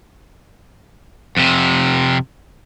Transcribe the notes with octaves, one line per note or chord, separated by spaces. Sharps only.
F2 C3